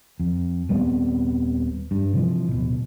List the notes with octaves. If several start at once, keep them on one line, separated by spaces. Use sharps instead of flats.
F2
D#1 G3 B3 C4
G2
C3 E3 F3
D1 B2